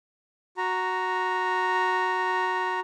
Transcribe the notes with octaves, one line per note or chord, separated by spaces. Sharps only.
F#4 A#5